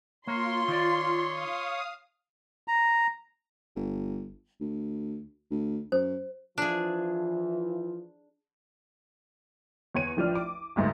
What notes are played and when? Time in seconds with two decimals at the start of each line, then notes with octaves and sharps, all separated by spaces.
0.27 A#3 F4 C#5 C6
0.68 D#3 D5
1.30 F5 D#6
2.68 A#5
3.76 G1
4.61 D2
5.51 D2
5.92 F#2 C5
6.58 E3 F3 D4 G#4
9.95 E2 C#5 D#7
10.17 A1 F3 D4 F6
10.35 D6
10.76 G1 D2 G#2